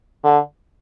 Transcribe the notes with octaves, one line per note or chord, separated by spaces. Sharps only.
D3